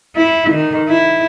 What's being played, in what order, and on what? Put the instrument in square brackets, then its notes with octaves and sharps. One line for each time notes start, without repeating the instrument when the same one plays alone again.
[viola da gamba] E4
D#3
E4